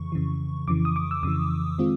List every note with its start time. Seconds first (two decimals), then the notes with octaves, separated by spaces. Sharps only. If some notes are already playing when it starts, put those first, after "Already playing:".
Already playing: F2 C#3 E3 C#6
0.12 F2 C#3 E3
0.68 F2 C#3 E3 D6
0.85 D#6
0.96 D6
1.11 E6
1.23 F2 C#3 E3 D#6
1.78 D#3 G#3 C4 F4